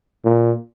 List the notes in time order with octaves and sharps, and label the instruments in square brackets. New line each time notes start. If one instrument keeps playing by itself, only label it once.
[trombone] A#2